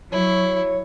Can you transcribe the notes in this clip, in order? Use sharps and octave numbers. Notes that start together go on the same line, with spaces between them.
F#3 E4 C#5